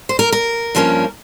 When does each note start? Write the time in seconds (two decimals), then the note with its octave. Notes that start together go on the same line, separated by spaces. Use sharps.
0.09 C5
0.19 A#4
0.32 A#4
0.75 G2 F3 A#3 C#4